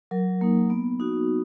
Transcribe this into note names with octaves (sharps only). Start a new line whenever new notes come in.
F#3 A#4
A#3 D#4
B3
D#4 F#4